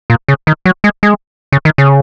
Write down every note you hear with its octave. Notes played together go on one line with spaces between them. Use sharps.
A#2
C#3
D#3
F#3
G#3
G#3
C#3
D#3
C#3